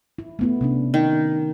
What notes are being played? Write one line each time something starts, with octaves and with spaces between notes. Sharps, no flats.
E4
A3 B3 E4
C3 C#4 D4
D#3